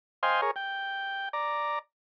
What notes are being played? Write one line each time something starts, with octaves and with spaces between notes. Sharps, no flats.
C5 D#5 F5 G5 G#5 C6
G#4 A#4 C#5
G5
D5 A#5